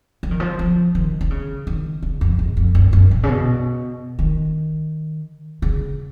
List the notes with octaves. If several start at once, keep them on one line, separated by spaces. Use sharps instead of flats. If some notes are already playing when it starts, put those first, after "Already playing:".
F3
D#3
F3
F3
D#3
D#3
C#3
D#3
C#3
F2
G#2
F2
F#2
F#2
A#2
C#3
B2
D#3
C#3